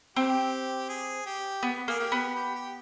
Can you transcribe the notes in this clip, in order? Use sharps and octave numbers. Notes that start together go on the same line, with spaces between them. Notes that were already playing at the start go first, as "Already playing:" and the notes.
C4 G4
G#4
G4
B3
A#3 G#4
G4
B3
G4
G4